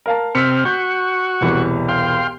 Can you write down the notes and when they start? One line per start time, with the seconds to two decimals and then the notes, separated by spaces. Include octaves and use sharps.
0.06 A#4 F5 A5
0.35 C3 C4 E6 F6 B6 C#7
0.65 F#4 C#6 G6
1.41 E1 C2 E3
1.89 F5 G5 C6